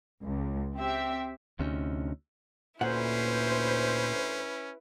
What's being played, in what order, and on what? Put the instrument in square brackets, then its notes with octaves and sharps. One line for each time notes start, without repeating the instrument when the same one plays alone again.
[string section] C#2
C4 G4 E5
[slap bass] D2 [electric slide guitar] C3 C#4 D#4
[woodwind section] D2 C5 [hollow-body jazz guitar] A#2 F#5 [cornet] C#4 [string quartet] E4 B4